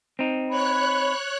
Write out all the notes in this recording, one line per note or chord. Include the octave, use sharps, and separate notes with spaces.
C4 D#4
C#5 B5 F#6